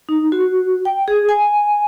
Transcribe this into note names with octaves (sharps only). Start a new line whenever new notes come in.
D#4
F#4
G5
G#4
G#5